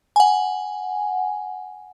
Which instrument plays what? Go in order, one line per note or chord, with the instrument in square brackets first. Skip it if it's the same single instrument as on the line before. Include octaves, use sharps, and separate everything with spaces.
[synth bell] F#5 G#5